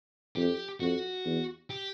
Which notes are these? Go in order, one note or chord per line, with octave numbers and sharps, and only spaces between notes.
F2 G4
F2 F#4
E2
G4